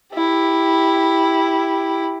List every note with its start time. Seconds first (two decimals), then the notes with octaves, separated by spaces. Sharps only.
0.14 E4 G4